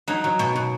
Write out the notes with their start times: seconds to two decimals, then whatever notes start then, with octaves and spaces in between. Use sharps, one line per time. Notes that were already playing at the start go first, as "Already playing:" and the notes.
0.08 F#3 D#4
0.24 F#3
0.39 B2
0.56 B2